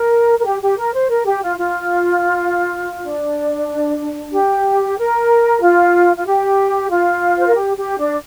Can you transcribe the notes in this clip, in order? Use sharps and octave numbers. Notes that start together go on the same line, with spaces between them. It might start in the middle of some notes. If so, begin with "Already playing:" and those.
Already playing: A#4
A#4
G4
G4
A#4
C5
A#4
G4
F4
F4
D4
G4
A#4
F4
F4
G4
F4
C5
A#4
G4
G4
D4